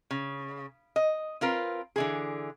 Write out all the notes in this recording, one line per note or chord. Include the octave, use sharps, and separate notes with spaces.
C#3
D#5
C4 F4 A#4 B4
D3 E3 G#4